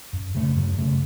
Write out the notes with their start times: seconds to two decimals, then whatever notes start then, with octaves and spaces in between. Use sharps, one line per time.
0.13 F#2
0.35 C#3 A3
0.56 F#2
0.78 C#3 A3